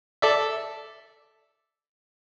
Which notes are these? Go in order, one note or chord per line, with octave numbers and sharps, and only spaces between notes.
A4 D5 E5